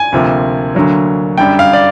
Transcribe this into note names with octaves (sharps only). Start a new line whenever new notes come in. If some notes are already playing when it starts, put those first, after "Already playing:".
Already playing: G#5
D2 C3 F3 A#3
D2 D3 F#3 A#3
F#2 D3 G3 G5
F5
D5